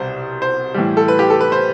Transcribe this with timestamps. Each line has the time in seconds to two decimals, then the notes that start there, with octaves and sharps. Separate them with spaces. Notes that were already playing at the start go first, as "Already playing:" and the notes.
Already playing: C2 B2 G3 C5
0.42 C5
0.74 A2 E3 G3
0.97 A4
1.08 B4
1.19 G4
1.30 A4
1.41 B4
1.52 C5